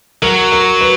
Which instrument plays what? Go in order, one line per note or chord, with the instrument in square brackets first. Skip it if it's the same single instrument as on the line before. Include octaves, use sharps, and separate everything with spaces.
[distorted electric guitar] F#3 [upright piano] A#4
[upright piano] A#4
B4